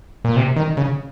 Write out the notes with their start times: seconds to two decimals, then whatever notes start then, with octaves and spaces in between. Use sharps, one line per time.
0.25 A#2
0.37 C3
0.56 D#3
0.77 C#3